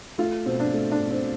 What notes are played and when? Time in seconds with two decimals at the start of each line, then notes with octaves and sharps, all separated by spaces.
0.18 A3 F4
0.46 B2 C4
0.60 D4
0.73 A3
0.92 D4
1.01 B2
1.11 C4